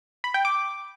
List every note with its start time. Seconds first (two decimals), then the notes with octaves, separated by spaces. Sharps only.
0.24 B5
0.34 G5
0.45 D6